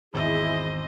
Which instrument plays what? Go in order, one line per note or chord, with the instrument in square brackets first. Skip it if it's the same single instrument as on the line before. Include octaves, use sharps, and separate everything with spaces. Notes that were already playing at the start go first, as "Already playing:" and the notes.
[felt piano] G#1 E2 E6 [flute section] E4 G#4 [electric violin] C5 D#5